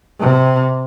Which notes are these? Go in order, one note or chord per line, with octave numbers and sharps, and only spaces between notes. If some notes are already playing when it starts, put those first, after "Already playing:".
C3